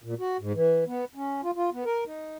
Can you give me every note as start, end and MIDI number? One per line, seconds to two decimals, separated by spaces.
0.04 0.14 46
0.19 0.37 66
0.39 0.53 44
0.54 0.84 52
0.87 1.05 59
1.15 1.41 61
1.43 1.51 65
1.56 1.70 65
1.73 1.84 59
1.85 2.04 70
2.06 2.38 63